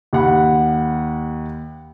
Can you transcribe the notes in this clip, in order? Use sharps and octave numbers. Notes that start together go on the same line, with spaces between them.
D#2 F#5 B5